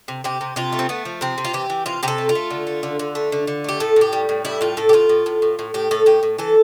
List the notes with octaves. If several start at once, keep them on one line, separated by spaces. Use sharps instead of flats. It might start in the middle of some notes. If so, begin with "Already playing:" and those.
C3
C3 G4
C3
C3 F4
A3
C4
A3 B3
F3
C3 C4
C3
F4
E3 G4
E3
C3 F4
C3 G4
A4
A3
F4
A3
D3
A3
D3
D3
A3
D3
D3
A3 G4
A2 A4
A2 G4
G3
A2
G3 E4
A2 F4
A2 A4
G4
A2 F4
A2
A2
A2
A2
A2 G4
A2 A4
A2 G4
A2
E3 A4